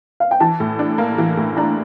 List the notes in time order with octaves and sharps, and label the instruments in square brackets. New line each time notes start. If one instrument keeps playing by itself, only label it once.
[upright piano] F5
G5
[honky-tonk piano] E3 [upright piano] A5
[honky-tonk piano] A2
D4
A#3
E3
A2
[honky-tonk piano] D4 [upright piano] A#5